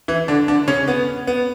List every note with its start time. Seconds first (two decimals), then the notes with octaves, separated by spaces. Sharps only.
0.08 E3 E4
0.28 D3 D4
0.48 D3 D4
0.68 C#3 C#4
0.88 B3
1.27 B3